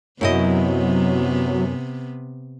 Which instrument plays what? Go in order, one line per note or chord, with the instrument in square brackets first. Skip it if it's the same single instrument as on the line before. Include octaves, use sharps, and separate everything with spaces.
[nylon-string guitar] F#2 E4 D#5 [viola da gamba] C3 B3 [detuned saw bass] F#3